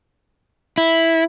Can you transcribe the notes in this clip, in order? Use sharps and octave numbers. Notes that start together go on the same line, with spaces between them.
E4